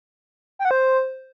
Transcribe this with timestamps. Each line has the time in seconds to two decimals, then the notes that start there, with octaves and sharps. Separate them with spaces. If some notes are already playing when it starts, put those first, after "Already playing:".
0.59 G5
0.65 F#5
0.71 C5